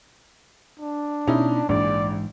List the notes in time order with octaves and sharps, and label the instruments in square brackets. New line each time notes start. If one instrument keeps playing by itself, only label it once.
[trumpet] D4
[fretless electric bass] B2 [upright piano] C#4 D#4 E4
[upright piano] A#1 [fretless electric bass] G#2 E3 [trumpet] D5